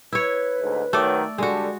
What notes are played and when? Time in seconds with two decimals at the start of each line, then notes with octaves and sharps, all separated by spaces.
0.12 E4 B4 C#5
0.60 D2 G#2
0.93 D#3 F#3 A3 D5
1.38 D3 G3 G#3 F#4 A4